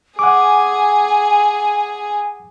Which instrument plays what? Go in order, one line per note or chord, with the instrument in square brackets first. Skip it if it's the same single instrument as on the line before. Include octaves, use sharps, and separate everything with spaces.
[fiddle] G#4 [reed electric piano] F#5 D6 [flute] G#5